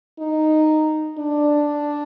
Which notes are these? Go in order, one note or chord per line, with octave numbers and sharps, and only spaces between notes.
D#4
D4